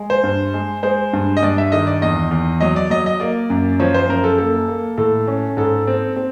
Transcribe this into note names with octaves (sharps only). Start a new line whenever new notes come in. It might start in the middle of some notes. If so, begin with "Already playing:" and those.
Already playing: G#3
C5
G2
G#3
G#3 C5
G2
D#5
G2 D5
E5
D#3 D#5
D5
E2 D#5
E2
F#3 D#5
D5
F#3 D#5
D#5
A#3 D5
F#2
F3 C#5
C5
F#2 A#4
A4
A#3 A4
A#3
A2 A4
C#4
G#2 A4
C4
C4